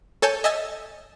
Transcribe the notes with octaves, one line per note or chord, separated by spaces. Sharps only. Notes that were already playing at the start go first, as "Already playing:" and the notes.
A4 C#5 G#5 A5 E6 G6
D#5 E5 G#5 E6 A6